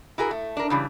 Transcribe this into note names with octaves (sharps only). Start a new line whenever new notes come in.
E4 F#4 G#4 A#4
A3
D4 A#4
C#3 E3 G3